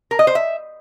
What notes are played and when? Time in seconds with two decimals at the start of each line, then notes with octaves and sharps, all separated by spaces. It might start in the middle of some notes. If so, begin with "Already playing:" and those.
0.11 A#4
0.19 D#5
0.27 C5
0.35 E5